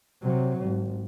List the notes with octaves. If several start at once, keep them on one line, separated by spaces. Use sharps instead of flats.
C3 F#3
G#1